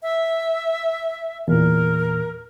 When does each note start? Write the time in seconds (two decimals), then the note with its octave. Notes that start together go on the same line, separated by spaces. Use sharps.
0.02 E5
1.48 E2 A#2 A#4